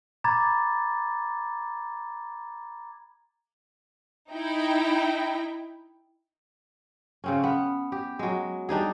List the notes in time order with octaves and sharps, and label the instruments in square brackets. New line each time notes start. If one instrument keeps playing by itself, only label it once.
[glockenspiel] A#5 B5 D6 G#6 A6
[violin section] D#4 E4 G5
[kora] C#3 C4 C#4
B3
G4
F#3 G#3
G3 D4 D#4 G#4